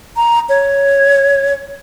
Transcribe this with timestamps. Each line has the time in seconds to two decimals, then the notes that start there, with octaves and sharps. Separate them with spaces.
0.17 A#5
0.49 C#5